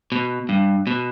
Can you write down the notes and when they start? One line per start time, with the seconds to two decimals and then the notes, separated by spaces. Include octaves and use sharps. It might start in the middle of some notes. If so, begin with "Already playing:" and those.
0.12 B2
0.49 G2
0.87 B2